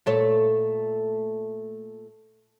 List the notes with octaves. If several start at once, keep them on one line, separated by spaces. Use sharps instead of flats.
A#2 A3 C#5